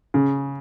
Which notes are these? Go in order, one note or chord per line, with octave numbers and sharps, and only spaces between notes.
C#3